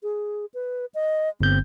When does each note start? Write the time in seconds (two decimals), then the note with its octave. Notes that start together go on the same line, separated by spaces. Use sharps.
0.03 G#4
0.54 B4
0.94 D#5
1.41 G1 C4 G6